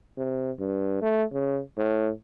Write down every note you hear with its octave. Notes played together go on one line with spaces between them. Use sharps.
C3
G2
A3
C#3
A2